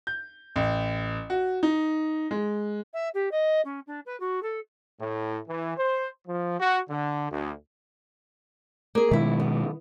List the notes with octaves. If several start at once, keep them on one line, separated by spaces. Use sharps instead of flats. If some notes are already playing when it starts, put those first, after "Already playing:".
G6
A1
F#4
D#4
G#3
E5
G4
D#5
C#4
D4
B4
F#4
A4
A2
E3
C5
F3
F#4
D3
D2
A#3 G#4
B2 D#3 G#3 E4 E5
B3